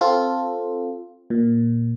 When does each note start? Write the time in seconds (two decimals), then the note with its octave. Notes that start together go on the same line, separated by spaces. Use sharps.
0.01 C4 F4 A4
1.30 A#2